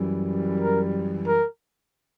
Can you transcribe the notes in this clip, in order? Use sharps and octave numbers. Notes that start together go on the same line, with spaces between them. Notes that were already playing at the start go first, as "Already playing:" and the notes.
Already playing: F#2 E3 G3
A#4
A#4